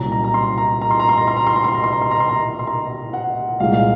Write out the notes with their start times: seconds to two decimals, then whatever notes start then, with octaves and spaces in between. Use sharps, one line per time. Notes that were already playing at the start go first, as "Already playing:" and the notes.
Already playing: C2 A#2 F#3 C#4 A#5
0.12 A#5
0.24 A#5
0.34 C6
0.58 A#5
0.82 A#5
0.91 C6
1.00 A#5
1.09 C6
1.18 A#5
1.28 C6
1.37 A#5
1.47 C6
1.56 A#5
1.64 C6
1.74 A#5
1.84 C6
1.93 A#5
2.02 C6
2.11 A#5
2.20 C6
2.29 A#5
2.59 C6
2.67 A#5
3.13 F#5
3.60 C2 A#2 G#3 F5
3.74 F5